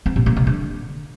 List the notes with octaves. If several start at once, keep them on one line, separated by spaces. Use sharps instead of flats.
C4
A#2
A#3
C3
D3